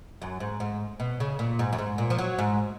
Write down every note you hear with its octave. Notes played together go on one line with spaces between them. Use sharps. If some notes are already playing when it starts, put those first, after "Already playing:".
F#2
G#2
G#2
B2
C#3
A#2
G#2
F#2
G#2
A#2
F3
F#3
G#2